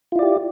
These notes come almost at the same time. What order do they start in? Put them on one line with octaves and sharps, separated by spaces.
F4 E4 D5 G4